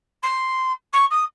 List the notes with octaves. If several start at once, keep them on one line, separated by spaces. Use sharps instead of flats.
C6
C#6
D#6